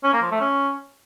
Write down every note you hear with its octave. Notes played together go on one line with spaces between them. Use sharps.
C#4
A#3
F3
A3
C#4